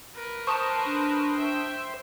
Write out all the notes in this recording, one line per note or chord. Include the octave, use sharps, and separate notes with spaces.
A#4 B4
C5 A5 C#6 D#6
D4
E5 G5